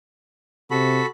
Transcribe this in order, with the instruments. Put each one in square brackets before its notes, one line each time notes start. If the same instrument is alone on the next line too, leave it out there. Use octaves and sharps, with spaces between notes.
[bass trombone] C3 [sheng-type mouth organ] F#4 A4 B5